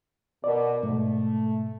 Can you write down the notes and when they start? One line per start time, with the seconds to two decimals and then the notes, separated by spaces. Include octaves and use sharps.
0.44 B2 A#4 D5
0.83 G#2 B2 A3